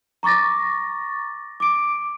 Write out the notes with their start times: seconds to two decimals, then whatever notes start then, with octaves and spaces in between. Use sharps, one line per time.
0.23 A#5 C#6 D6 A6 A#6
1.60 D6 D7